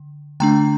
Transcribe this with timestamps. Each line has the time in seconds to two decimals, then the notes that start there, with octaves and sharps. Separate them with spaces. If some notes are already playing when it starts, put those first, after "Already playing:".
Already playing: D3
0.40 D3 A3 D4 G5 A#5